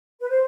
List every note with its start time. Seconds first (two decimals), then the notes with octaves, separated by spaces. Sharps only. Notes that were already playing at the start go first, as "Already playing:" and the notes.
0.21 B4
0.29 C5